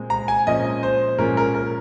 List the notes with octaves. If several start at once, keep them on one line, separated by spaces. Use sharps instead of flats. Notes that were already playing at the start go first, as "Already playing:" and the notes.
Already playing: A#2 G#3 C4
A#5
G#5
A#2 F3 G#3 C#4 D#5
C5
A#2 F3 G#3 C#4 A#4
A#4
A#4